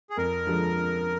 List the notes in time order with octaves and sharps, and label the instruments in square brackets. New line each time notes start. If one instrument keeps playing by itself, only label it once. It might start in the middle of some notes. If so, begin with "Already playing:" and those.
[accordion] G#4
[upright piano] F2 [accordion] A#4
[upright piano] D3 F3 G#3